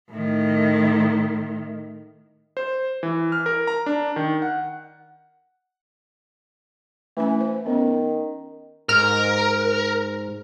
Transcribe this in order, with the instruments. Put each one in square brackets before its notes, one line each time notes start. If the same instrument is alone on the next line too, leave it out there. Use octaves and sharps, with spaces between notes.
[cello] A2 D#3
[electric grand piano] C5
E3
F6
A#4
A#5
D4
D#3
F#5
[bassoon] E3 [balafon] A3 C#4 G#5
[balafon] C5
[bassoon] D#3 [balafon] B3 C#4
[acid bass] G#2 [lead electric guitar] A#4 [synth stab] F6